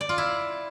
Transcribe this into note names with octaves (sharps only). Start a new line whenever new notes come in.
D5
F4
E4